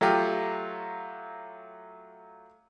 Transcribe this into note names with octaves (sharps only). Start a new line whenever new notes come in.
F#3 A3 F4 G4